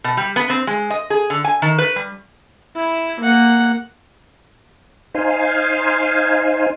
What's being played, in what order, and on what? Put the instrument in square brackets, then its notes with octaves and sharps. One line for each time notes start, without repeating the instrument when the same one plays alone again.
[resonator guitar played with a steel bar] B2
G3
B3
C4
G#3
D#5
G#4
D3
G#5
D#3
B4
G3
[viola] E4
A#3 F#5
[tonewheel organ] D#4 C5 F5 G#5